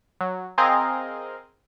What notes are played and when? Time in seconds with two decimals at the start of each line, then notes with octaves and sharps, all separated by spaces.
0.21 F#3
0.58 C4 G#4 A#4 D#5 F5